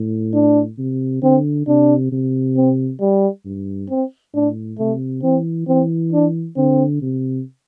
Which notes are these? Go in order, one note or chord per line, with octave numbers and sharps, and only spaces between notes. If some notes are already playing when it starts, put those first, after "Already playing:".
Already playing: A2
D4
C3
D3 C4
C3 D4
C3
C4
G3
G2
C4
A2 D4
C3 A3
E3 C4
E3 C4
D4
D3 C4
C3